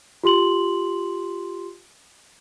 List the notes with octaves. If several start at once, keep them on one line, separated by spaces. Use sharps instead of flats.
F4 G4 C6 F#7